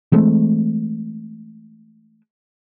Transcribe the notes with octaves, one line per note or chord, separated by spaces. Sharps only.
E3 G#3 A3 C4